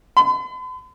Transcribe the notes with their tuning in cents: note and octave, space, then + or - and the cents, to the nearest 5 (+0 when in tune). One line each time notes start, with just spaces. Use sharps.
B5 +45